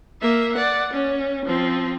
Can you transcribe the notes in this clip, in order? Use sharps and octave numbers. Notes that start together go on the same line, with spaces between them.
A#3 E5
D5 F#5
C#4
F3 C4